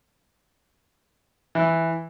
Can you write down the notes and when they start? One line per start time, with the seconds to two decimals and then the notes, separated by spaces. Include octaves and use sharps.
1.55 E3